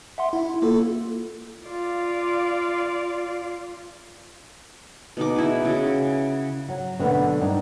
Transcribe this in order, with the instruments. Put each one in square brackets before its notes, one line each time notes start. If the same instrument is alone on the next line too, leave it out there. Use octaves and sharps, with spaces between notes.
[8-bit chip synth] E5 F#5 C6
E4
A#3 F4 A4
[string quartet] F4 D5 F5
[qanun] B2 D#4 D6
E4 G#4
C#3 F#4
[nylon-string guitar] F#3
B2 D3 F#3 A3 B3
G2 D4 D#4